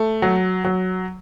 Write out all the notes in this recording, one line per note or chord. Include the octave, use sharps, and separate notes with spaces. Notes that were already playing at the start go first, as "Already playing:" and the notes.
Already playing: A3
F#3
F#3